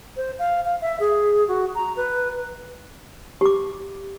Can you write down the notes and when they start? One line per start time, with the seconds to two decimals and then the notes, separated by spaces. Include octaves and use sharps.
0.17 C5
0.39 F5
0.65 F5
0.81 E5
1.00 G#4
1.48 F#4
1.75 A#5
1.97 B4
3.41 G4 D6